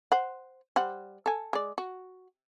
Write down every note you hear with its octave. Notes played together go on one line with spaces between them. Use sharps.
C5 F#5
G3 C5 F#5
A4 G#5
G#3 D5
F#4